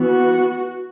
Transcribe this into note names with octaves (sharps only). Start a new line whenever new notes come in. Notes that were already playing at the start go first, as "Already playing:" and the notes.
Already playing: E3 B3 F#4